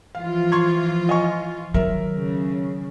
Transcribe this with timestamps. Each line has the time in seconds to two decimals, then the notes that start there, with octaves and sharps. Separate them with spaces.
0.15 E3 F3 F4 F5
0.52 C6 C#6 G#6
1.09 D#5 G#5 C#6
1.74 D#3 F#3 A#4 E5
2.14 C#3